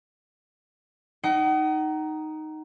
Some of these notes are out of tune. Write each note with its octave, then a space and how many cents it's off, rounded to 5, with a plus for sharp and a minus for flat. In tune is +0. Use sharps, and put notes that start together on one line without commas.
D#4 +0 F#5 +40